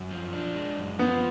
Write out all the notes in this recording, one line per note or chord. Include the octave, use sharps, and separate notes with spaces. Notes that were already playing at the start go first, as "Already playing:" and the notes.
Already playing: F#2
F3
D4
G#3
F#2
F3 B3